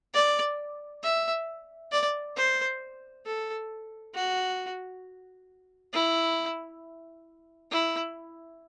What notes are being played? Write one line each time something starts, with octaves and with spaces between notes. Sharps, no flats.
D5
E5
D5
C5
A4
F#4
E4
E4